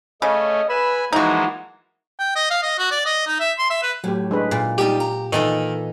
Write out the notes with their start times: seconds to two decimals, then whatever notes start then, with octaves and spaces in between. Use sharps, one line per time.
0.22 C#3 A3 C#4 D#5
0.69 B4 G#5 B5 E6
1.13 E3 F3 G#3 A#3 D#4 F#4
2.20 G5
2.36 D#5
2.50 F5
2.63 D#5
2.79 F#4
2.91 D5
3.06 D#5
3.27 D#4
3.40 E5
3.59 C6
3.70 E5
3.83 B4
4.04 A2 F#3 G4
4.31 G#3 D4 B4
4.51 A#2
4.78 G3 D#4 F4 G4
5.00 A#5
5.33 A#2 D#3 E3 D#4 A4 D#5 E5